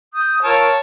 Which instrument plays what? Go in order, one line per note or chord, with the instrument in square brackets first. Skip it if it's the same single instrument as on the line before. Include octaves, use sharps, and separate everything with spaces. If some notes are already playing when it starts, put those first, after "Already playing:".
[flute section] D#6 G6
[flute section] F4 A#4 E6 [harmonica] C#5 A5